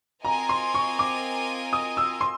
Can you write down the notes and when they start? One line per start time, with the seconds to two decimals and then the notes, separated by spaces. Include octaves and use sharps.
0.25 C4 F4 A#4 D#5 G#5 A#5
0.49 C6
0.74 C#6
0.99 D6
1.73 D#6
1.97 E6
2.21 C6